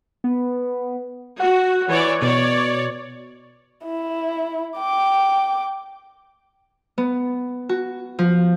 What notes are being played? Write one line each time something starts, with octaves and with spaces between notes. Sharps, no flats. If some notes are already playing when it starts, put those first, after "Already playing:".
B3
F#4 F#5
E3 C#5 D5
B2 C#5 D5
E4
G5 D6
B3
F#4
F3